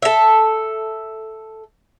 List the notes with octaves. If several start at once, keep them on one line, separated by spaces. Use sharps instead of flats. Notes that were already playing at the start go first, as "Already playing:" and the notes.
A4 E5